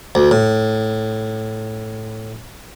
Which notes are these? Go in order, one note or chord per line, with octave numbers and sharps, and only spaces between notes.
D2
A2